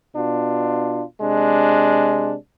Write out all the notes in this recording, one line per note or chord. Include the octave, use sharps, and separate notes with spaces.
B2 D4 F4
C3 G#3 D4